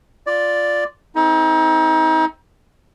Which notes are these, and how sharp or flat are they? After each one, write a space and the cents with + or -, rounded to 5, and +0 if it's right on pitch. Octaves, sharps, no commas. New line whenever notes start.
F4 +0 D5 +0
C4 +0 D#4 +35 A4 +0